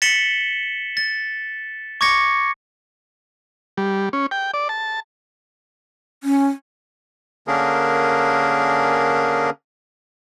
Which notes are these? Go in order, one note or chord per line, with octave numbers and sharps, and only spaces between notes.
A6 B6 C#7 E7 F#7 G7
A6
C#6 D6 G#6 A#6 C#7
G3
C#4
G5
D5
A5
C#4
D3 A#3 C#4 D4 G#4 A#4